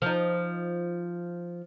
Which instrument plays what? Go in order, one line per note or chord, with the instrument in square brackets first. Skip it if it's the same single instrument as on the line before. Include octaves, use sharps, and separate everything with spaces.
[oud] F3 D#4